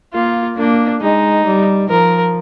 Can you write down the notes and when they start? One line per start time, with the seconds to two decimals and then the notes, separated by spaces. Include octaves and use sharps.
0.13 A#3 F4
0.58 A#3 D4
1.01 G#3 D#4
1.45 G3
1.89 F3 A#4